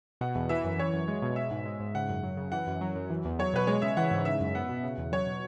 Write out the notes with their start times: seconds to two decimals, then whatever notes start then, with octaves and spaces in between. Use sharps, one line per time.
0.21 B2 F#5
0.35 E2
0.49 E3 E5
0.64 F#2
0.79 E3 C#5
0.93 F#2
1.08 G#3
1.22 B2
1.36 G#3 E5
1.51 G#2
1.65 G#3
1.80 G#2
1.95 C#3 F#5
2.09 F#2
2.23 F#3
2.37 C#3
2.52 E3 F#5
2.67 F#2
2.81 F#3
2.96 F#2
3.10 E3
3.25 E2
3.39 F#3 C#5
3.54 B2 B4
3.67 G#3 C#5
3.82 C#3 E5
3.97 E3 F#5
4.11 G#2
4.25 C#3 E5
4.40 F#2
4.55 B3 F#5
4.69 B2
4.83 C#3
4.98 E2
5.12 F#3 C#5
5.27 B2